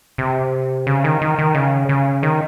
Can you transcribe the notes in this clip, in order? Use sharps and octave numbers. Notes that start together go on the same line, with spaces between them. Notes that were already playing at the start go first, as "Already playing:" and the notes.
C3
C#3
D#3
D#3
D#3
C#3
C#3
D#3